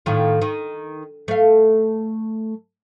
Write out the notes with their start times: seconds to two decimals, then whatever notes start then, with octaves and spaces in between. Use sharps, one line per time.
0.06 A2 D#3 F4
0.42 D#3
1.28 A3 F5